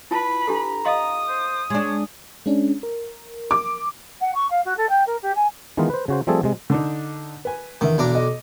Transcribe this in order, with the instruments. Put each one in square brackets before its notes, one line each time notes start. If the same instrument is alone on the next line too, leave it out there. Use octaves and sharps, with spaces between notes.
[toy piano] E4 F4 A5 [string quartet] B4 B5
[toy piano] D4 G4 A4 [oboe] A#5
[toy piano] D#5 F5 C6 [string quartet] D#6
[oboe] C5
[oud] G#3 D4 [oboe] C#5
[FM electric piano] G#3 C#4 D4
A#4
[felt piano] D6
[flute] F#5
C#6
F5
F#4
A4
G5
A#4
G4
G#5
[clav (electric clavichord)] D#3 E3 G#3 B3 D#4 F4
B4 C5
C#3 F#4 C5
F3 G3 A3 C4 G#4 A4
C3 G#3
[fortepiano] D3 D4 D#4
B4 G#5
[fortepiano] E2 D3 E5 [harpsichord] D#3
[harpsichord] B1 D4 A#5
[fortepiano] D#5